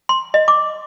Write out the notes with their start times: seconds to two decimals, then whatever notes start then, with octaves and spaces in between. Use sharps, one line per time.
0.09 C6
0.34 D#5
0.48 D6